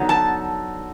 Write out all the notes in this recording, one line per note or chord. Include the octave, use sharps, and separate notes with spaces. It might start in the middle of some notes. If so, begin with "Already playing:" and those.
Already playing: D3 F#3 B3 D#4
A5